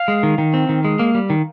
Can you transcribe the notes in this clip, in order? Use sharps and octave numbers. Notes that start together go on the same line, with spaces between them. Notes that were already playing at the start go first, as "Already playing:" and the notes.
Already playing: F5
G#3
D#3
D#3
C4
D#3
G#3
A#3
G3
D#3